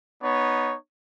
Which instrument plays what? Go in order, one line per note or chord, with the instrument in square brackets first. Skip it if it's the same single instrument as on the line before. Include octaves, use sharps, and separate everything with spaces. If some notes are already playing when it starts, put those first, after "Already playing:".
[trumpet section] B3 D#4 C#5